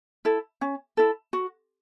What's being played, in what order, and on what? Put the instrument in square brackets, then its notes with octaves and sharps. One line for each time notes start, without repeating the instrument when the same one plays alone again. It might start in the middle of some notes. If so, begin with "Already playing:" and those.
[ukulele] E4 A4
C#4
E4 A4
F#4